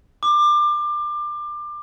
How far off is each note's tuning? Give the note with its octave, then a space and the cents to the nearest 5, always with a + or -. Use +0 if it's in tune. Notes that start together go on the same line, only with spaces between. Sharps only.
D6 +25